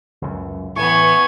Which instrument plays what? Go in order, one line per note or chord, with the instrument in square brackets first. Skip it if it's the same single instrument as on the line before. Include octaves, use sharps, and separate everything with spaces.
[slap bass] C#2 F#2
[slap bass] A2 E3 [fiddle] B3 G#5 [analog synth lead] C#6